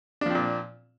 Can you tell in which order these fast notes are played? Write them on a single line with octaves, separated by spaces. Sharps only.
D4 F3 C4 A#2